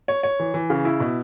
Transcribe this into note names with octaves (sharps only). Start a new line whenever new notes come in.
C#5
C#5
E3
E3
C#3
E4
B2